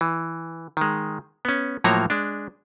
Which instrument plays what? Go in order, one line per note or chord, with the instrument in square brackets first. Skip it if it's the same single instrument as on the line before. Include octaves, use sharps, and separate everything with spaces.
[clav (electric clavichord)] E3
D#3 G#3
B3 C#4
A2 F3 F#3 A#3 C#5 A#5
G#3 D4